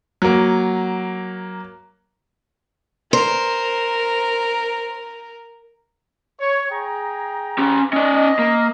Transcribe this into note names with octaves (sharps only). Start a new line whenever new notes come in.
F#3 A#3
A#4 C5
C#5
G#4 G5 A#5
C#4 G4
C#4 D5 D#5
A#3